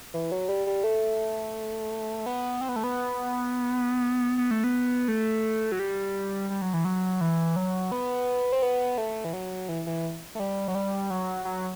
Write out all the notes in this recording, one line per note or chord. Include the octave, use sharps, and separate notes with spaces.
E3
F#3
G3
G3
A3
B3
C4
B3
A3
B3
B3
A3
B3
A3
F#3
G3
G3
F#3
E3
F#3
E3
F#3
B3
C4
B3
A3
E3
F#3
E3
E3
A3
G3
F#3
G3
F#3
F#3